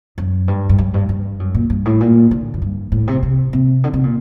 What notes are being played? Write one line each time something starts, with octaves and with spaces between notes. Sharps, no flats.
F#2
G2
G2
F#2
G2
G2
F#2
A#2
G2
A2
A#2
D3
F#2
G2
A2
C3
C3
C3
D3
C3
A#2